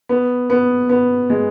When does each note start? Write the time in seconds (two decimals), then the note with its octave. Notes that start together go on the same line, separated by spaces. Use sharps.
0.09 B3
0.50 B3
0.89 B3
1.30 G#3